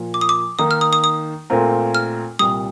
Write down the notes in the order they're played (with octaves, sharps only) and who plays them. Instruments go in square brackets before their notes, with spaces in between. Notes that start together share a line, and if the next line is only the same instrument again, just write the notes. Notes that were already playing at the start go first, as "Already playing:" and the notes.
Already playing: [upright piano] A#2 F3 A#3
[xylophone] D6
D#6
D6
[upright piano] D#3 A#3 D#4 [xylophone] D#6
[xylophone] F6
D#6
D#6
D#6
[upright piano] A#2 A3 C4 F4 A#4
[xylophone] F6
[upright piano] C2 A#2 G3 [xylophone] D#6